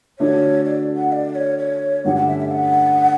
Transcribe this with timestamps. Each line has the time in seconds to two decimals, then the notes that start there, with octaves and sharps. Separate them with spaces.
0.19 D3 A3 D4 F#4 A4 C#5
0.65 D5
0.97 F#5
1.12 D5
1.35 C#5
1.59 C#5
2.05 G2 D3 A3 C#4 G4 F#5
2.16 F#5
2.28 E5
2.40 E5
2.51 F#5